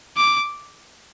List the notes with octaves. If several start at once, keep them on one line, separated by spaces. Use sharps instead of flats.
D6